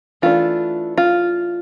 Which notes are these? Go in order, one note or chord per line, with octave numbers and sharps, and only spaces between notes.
E3 A3 D4 F4
F4